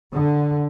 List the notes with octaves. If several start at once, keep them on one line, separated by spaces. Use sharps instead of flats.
D3